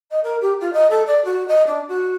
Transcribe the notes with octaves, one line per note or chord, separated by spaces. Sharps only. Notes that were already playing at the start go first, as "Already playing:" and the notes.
D#5
A#4
G4
F4
D#5
A4
D5
F#4
D#5
D4
F#4